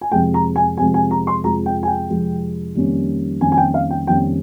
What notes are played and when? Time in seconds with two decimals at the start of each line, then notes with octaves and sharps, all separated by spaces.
0.01 G#5
0.12 F2 C3 F3 G#3 G5
0.34 A#5
0.56 G#5
0.78 F2 C3 F3 G#3 G#5
0.94 G#5
1.11 A#5
1.27 C6
1.44 F2 C3 F3 G#3 A#5
1.66 G5
1.83 G#5
1.87 G5
2.10 F2 C3 F3 G#3
2.75 F2 D#3 G3 A#3 C#4
3.41 F2 D#3 G3 A#3 C#4 G#5
3.52 G#5
3.58 G5
3.74 F5
3.91 G5
4.07 F2 D#3 G3 A#3 C#4 G5